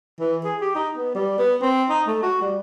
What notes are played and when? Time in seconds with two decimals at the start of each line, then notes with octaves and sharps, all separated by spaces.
0.20 E3
0.44 G#4
0.61 G4
0.75 D#4
0.97 B3
1.15 G3
1.39 B3
1.62 C4
1.89 D#4
2.07 A3
2.23 F#4
2.42 G3